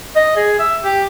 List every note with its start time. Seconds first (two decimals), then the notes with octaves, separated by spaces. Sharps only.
0.15 D#5
0.36 G#4
0.59 E5
0.83 G4